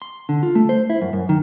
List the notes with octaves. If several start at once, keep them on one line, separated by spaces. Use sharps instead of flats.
C6
D3
F4
A3
C5
E4
F#2
F#2
D#3